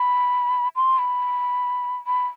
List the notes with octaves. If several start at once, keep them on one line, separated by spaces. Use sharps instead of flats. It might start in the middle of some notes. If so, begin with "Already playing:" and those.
Already playing: B5
C6
B5
B5